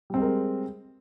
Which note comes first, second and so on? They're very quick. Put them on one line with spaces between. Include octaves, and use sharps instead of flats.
G3 C4 G#3 A#4